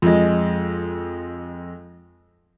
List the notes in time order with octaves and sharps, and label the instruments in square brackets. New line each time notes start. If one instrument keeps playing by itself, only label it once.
[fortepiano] F2 G#3